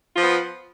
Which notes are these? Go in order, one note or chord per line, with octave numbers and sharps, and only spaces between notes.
F3 B3 F4